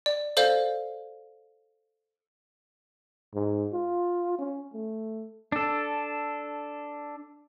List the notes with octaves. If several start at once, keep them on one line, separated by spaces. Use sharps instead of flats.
D5
A4 C5 D5 F5 G6
G#2
F4
C#4
A3
D4 A4